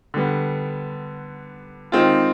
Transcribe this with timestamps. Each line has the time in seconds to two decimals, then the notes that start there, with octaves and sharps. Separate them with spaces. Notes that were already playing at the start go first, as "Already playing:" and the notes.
0.14 D3 G3 B3
1.92 D#3 G#3 C4 F4